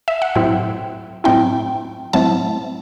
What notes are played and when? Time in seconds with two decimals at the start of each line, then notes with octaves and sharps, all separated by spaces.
0.08 E5
0.22 F#5
0.35 A2 F#3 C4 E4 G5
1.24 A2 F#3 C4 E4 G5
2.13 A2 F#3 C4 E4 A5